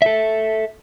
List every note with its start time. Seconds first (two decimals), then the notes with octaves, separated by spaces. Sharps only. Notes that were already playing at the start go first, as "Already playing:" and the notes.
0.02 A4 E5